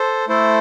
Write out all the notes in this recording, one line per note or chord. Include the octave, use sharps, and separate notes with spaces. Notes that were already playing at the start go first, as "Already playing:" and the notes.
Already playing: A4 C5
A3 E4 A4 C5